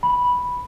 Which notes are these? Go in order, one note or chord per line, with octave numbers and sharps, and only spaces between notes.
B5